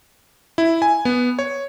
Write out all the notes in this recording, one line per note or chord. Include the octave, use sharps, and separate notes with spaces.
E4
G#5
B3
C#5